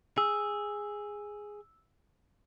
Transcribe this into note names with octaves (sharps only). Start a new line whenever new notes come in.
G#4 E6